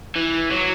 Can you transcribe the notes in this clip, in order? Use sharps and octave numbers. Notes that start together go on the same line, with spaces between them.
E3
F#3